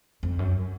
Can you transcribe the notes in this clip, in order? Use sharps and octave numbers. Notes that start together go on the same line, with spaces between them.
F2
F#2